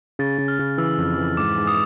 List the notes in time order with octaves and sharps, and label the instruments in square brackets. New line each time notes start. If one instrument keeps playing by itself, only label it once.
[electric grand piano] C#3 [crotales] A6
[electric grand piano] C#3
[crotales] F6
[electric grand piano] C#3
[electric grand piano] E3 [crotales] E6
[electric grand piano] F2
E3
[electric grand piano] G#2 [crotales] D6
[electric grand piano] G#2
[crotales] D#6